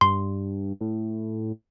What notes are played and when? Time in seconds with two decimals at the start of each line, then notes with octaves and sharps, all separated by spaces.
0.01 G2 C6
0.81 A2